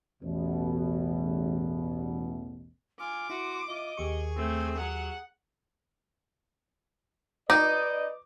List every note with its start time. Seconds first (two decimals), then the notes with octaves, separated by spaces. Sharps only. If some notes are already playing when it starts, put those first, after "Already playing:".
0.23 A1 E2 B2
3.00 F4 G#5 D6
3.30 E4 F#4 C6
3.68 F4 D#5
3.97 D#2 G4 G#4 C#6
4.37 A3 C4
4.78 F#3 F#5
7.50 D#4 B4 D5 D#5 D6